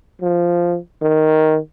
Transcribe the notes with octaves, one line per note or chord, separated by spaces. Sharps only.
F3
D#3